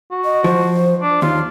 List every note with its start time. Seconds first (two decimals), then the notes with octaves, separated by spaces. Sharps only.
0.11 F#4
0.25 D#5
0.44 F3 C5
1.02 D4
1.22 D#2 D#4 F4